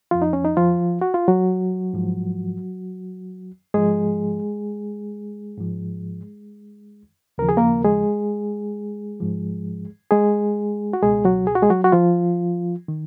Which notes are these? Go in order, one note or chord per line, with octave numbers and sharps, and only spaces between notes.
F2 F3 F4
D#4
C#4
D#4
F3 F4
F#4
F4
F#3 F#4
G#2 F3
G#2 F3 G#3 G#4
G#2 F3
D#2 C#3 F3 A#4
G#4
A#3 A#4
G#3 G#4
G#2 F3
G#3 G#4
F#4
C#2 B2 G#3 G#4
F#3 F#4
G#4
F#4
G#3 G#4
F#3 F#4
F#4
F3 F4
D#3